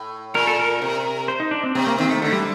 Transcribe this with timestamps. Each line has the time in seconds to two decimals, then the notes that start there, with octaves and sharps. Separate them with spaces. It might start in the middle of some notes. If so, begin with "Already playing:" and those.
Already playing: A2
0.34 A#2 A#4
0.47 A4
0.59 A#4
0.82 C3
1.28 C5
1.40 D#4
1.51 D4
1.63 C4
1.75 C3 C4
1.87 A#3
1.98 D#3 C4
2.10 A3
2.22 D3 A3
2.32 G3